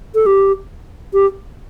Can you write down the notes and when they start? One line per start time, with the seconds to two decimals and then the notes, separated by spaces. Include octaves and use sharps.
0.15 A4
0.26 G4
1.13 G4